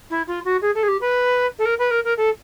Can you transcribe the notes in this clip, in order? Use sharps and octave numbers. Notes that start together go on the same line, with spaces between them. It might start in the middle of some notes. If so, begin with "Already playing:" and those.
E4
F4
F#4
G#4
A4
G#4
G4
B4
A4
A#4
B4
A#4
A#4
A4